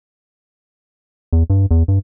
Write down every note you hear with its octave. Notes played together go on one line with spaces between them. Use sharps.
E2
G2
E2
G2